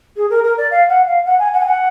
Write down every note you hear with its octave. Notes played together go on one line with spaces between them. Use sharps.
G#4
A#4
A#4
D5
F5
F#5
F5
F#5
G#5
F#5
G#5
F#5